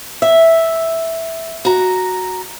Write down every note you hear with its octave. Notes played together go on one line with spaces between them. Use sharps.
E5
F#4 A#5